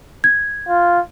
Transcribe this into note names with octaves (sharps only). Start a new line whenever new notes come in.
G#6
F4